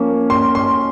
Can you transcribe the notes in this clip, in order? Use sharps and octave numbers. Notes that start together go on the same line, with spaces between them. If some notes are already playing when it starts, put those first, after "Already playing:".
Already playing: F3 A#3 C#4
C6
C6